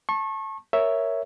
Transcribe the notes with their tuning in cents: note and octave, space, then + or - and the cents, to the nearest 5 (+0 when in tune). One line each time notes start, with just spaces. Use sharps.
A5 +5 C#6 -30
A#4 +0 C#5 +0 E5 +0